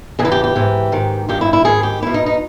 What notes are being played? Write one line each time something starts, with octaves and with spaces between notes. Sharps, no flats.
E2 C#3 E3 G#4
E4
G4
G4
G#2 E3
G#2 D#3
G2 D#3 G4
E4
E4
G#2 D#3 G#4
G4
E2 B2 E4
D#4
D#4